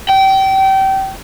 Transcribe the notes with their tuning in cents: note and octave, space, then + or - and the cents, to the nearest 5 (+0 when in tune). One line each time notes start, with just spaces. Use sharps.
G5 -25